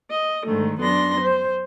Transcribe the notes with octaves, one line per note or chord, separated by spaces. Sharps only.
D#5
G#2 D3 D#3 A3
F#2 B3 D4 C6 A#6
C5